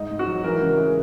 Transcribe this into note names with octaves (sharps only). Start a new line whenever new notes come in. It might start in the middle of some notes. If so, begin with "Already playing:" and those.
Already playing: G#2 D#4
G#2
F#4
F#3
E3 A#4
C#3
G#3